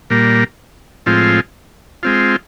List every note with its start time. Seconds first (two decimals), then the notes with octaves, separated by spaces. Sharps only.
0.10 A#2 G3 A#3
1.06 A2 F3 G#3 C4 F4
2.03 G#3 C4 F4